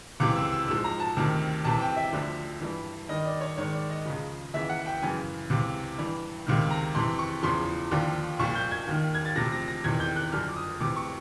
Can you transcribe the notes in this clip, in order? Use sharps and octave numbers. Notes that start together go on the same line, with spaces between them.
C#2 C3 E3 D6
E6
E6
G#2 F3 E6
A#5
A5
D2 C3 D#3
C2 C3 E3 A5
G5
E5
D2 D3 F3
G2 E3
G2 D#3 D#5
D5
C#5
G#2 D#3 C#5
D5
D#5
C#2 C#3 F3
D#2 C#3 E3 E5
F#5
G5
F#2 C#3 E3 G#5
C#2 C3 E3
G2 E3
C#2 C3 D#3
A#5
F2 C3 E3 C6
C#6
E2 C#3 F3 C6
D#2 D3 F3
C2 A#2 F3 C#6
G6
G#6
D#2 D#3
G#6
A6
D2 C3 F3 A#6
A#6
A#6
E2 C3 D#3 G#6
G6
F#6
F#2 D3 F3 F6
D6
D#6
D2 C3 E3 D6
C#6